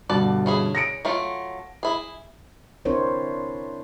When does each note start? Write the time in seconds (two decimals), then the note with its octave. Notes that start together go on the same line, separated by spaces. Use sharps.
0.09 G2 B2 D3 D5 F#5 A5
0.46 C#4 E4 G#4
0.75 A#6 C#7 D7
1.05 F#3 A3 F4
1.83 E4 G#4
2.85 C4 D4 E4 A#4 C5 C#5